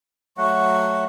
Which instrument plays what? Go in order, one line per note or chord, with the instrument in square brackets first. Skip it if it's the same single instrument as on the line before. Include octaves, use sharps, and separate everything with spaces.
[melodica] F#3 A3 F#5 [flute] C#6